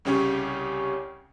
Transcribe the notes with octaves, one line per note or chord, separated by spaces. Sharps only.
C2 C#3 C#4 G4 C#5